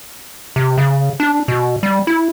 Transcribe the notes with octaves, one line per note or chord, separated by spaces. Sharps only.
C3
C#3
D4
B2
G3
E4